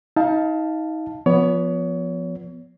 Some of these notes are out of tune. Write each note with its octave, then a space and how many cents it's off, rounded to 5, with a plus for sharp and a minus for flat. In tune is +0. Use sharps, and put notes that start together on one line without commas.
D#4 +30 F5 +0 A5 +0
F3 +0 B3 +0 C#5 +35